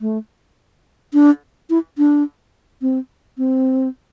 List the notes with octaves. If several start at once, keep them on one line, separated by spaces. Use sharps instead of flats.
A3
D4
E4
D4
C4
C4